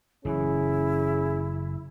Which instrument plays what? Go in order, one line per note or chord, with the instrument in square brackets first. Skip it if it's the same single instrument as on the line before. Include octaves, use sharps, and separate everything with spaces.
[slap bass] F#1 E3 [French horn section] C#4 G#4 [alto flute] E4